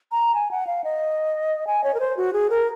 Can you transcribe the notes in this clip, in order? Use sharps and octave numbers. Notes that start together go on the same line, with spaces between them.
A#5
G#5
F#5
F5
D#5
G#5
C#5
A#4
C5
F#4
G#4
A#4